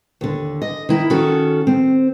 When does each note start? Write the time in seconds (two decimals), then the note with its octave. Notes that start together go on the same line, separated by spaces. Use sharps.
0.21 D#2 D3
0.62 D#5
0.89 D#3 E4
1.10 D#3 C#4 F#4 A4
1.67 C4